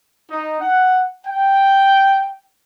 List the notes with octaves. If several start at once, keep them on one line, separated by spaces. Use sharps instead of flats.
D#4
F#5
G5